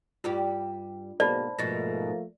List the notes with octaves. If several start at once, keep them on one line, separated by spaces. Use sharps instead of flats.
G2 G3 F4 G4
B1 G#2 A#3 C5 D5 A5 B5
G#2 B2 F3 A3 A#3 A6 A#6